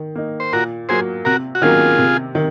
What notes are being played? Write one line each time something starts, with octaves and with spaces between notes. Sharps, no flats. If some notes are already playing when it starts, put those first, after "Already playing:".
Already playing: D#3
A#3 D#4
C5
A#2 F#4 A#4
F#3 A#3 G#4 C5
C3 F#4 A#4
F#4
D#3 F#3 A#3 C#4 F4 G#4
C3
D#3